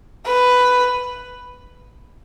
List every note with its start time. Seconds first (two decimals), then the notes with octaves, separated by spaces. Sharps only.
0.27 B4